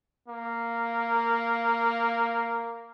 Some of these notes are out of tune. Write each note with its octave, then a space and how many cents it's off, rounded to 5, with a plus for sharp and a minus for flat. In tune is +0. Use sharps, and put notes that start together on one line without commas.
A#3 -5